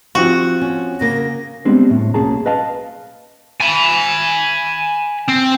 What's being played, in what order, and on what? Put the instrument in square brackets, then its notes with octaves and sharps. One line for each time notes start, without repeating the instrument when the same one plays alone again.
[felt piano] F3 C4 G4 [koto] F#4
[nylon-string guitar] C#4
[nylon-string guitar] C#3 A#3 [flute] A#6
[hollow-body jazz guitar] G3 G#3 B3 C4 D4
A2 A3
B1 A#3 C#4 G#4 A5 A#5
B4 D#5 F5 A5
[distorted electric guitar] G#5 B5
C4